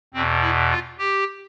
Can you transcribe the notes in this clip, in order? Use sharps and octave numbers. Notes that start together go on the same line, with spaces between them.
E2 B2 C4
E4
F4
G4